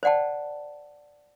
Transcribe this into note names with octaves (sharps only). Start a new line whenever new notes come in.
C5 D5 F#5 G5 A5